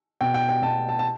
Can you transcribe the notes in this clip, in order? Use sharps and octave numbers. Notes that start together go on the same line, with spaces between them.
B2 G5
G5
G5
B2 A5
A5
A5